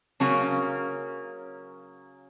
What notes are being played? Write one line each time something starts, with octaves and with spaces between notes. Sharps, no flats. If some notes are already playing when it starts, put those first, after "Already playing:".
C#3 F#3 A#3 C#4